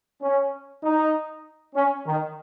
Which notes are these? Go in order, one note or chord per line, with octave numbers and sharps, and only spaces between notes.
C#4
D#4
C#4
D#3